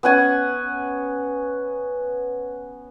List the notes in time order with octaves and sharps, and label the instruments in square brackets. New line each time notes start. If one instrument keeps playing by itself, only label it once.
[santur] B3 C#4 F#5 G#5